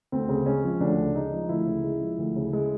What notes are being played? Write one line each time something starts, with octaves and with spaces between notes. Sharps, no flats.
D2 C4
C#3
G#3 C#4
F3
D2 D4
C#3
G#3 D#4
F3
D2 E4
C#3
G#3
F3
D2
C#3
G#3